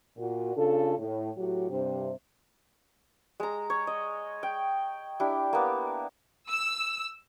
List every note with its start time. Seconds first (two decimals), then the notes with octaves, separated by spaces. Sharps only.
0.18 A#2 F#4
0.56 C#3 D4 F4 A4
0.98 A2
1.37 A2 F#3 F#4 G4
1.70 G2 C3 C5
3.40 G#3 A#5
3.70 C#5
3.87 D#5
4.43 G5
5.20 D4 E4 G4
5.53 A#3 B3
6.50 E6